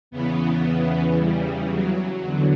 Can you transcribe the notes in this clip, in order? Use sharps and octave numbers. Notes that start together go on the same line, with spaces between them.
E2 C#3 E3 B3
G3
F#3
E2 D3